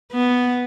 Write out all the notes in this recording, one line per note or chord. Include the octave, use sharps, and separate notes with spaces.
B3